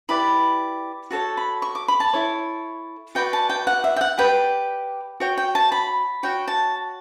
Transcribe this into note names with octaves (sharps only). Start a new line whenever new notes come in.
E4 G4 B4 D5 B5
F#4 A4 C#5 A5
B5
C#6
D6
B5
A5
E4 A4 C#5
F#4 B4 D5 G5
A5
G5
F#5
E5
G5
F#5
G4 B4 D5 G5
F#4 C#5 G5
G5
A5
B5
F#4 C#5 G5
A5